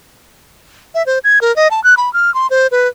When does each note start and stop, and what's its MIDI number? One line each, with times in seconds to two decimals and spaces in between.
0.95 1.05 76
1.06 1.19 72
1.24 1.39 92
1.41 1.54 70
1.56 1.68 75
1.71 1.83 81
1.84 1.95 90
1.97 2.12 83
2.13 2.33 89
2.34 2.47 84
2.50 2.67 72
2.71 2.88 71